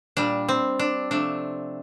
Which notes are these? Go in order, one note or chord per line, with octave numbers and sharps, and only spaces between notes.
A#2 G3 D4
C4
D4
C3 F3 A3 D4